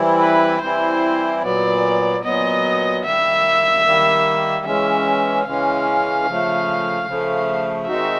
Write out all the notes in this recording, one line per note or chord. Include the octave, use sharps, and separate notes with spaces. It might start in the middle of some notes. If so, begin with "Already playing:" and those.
Already playing: E3 G3 C4 E4
B4
E3 G3 C4 E4 C5
A#2 F#3 B3 D5
A#2 F#3 B3 D#5
D#3 G3 A#3 E5
D#3 G3 A#3
C#3 E3 G#3 C#4 E5
C#3 E3 G#3 C#4 F5
C#3 F3 A3
C#3 F3 A3
D#3 G#3 C4 D#4 F#4 E5